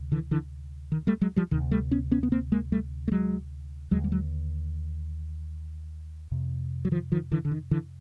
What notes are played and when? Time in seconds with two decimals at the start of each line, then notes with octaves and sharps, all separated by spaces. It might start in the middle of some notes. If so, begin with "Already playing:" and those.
Already playing: D2 C3
0.12 D3 E3
0.31 D3 E3
0.92 D#3
1.07 G3 A3
1.21 F#3 G#3
1.36 F3 G3
1.51 D2 C3 D#3
1.71 G3 A3
1.91 B3 C#4
2.12 B3 C#4
2.23 B3
2.32 A#3 C4
2.52 G#3 A#3
2.72 G3 A3
3.08 A3
3.12 F#3 G#3
3.91 D#2 D3 F#3 G#3
4.04 G3
4.12 F#3 G#3
6.31 F2 C3
6.85 F#3
6.91 D#3 F3
7.12 D#3 F3
7.32 D3 E3
7.45 D3
7.51 D#3
7.71 D3 E3